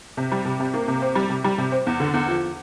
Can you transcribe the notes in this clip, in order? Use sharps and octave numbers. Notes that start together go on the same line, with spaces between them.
C3
G3
C3
C3
A#3
C3
C4
G3
C3
G3
C3
C4
E2
D3
E2
F3